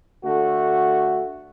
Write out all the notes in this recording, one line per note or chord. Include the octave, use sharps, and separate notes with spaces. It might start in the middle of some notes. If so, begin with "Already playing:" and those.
D3 A3 F#4